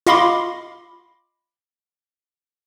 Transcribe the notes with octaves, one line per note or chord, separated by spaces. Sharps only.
F4 D#5 F5 B5 C6 D6